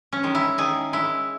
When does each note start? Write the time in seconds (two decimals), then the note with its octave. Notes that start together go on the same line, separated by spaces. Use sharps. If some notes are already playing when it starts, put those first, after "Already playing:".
0.13 C#4
0.23 D#3 G#3
0.35 E4
0.58 D#3 G#4
0.93 G#3 E4